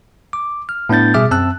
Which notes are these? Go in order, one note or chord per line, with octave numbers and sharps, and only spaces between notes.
D6
F6
A2 B3 D4 G6 A6
B2 G3 G#4 E5 D6 F6
F#2 C4 A5 E6 F#6